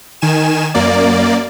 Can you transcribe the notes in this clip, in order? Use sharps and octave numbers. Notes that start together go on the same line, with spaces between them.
D#3 G#5 E7
F#2 A#3 D5